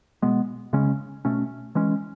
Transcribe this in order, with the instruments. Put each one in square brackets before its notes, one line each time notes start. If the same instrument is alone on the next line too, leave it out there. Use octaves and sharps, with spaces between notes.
[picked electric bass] B2 G#3 B3
C#3 G#3 C#4
B2 A3 C#4
E3 G#3 C#4